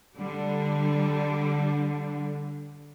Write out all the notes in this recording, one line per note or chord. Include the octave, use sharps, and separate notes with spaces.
D3 G3